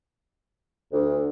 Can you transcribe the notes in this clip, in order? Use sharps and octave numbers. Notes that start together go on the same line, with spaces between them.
D2